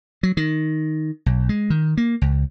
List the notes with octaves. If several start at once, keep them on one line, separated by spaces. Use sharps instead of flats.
F#3
D#3
B1
G#3
D#3
A#3
C#2